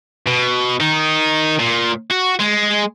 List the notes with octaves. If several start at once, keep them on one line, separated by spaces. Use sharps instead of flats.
B2
D#3 D#4
A#2
F#4
G#3